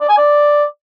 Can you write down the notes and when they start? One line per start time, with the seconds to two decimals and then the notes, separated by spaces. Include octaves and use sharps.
0.01 D5
0.09 G#5
0.17 D5